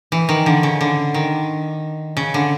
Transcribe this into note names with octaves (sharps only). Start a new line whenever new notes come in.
E3
D#3
D3
C#3
D3
D#3
C#3
D3